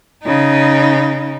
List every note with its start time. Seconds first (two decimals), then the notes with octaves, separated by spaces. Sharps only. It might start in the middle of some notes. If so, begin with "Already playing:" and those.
0.24 C#3 D#4